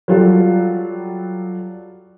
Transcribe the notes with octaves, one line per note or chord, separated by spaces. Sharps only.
F#3 G3 F4 F#4 A4